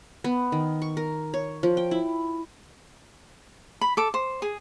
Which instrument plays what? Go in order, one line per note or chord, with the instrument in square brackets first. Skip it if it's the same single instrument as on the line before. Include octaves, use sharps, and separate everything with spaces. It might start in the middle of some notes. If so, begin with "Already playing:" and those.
[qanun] B3
D#3
C#6
A#4
C#5
F3
G5
E4
[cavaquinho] B5
A4 D6
C5
G#4